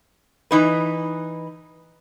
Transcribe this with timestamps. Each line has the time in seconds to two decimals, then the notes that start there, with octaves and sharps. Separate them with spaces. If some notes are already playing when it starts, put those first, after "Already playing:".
0.51 E3 D#4 B4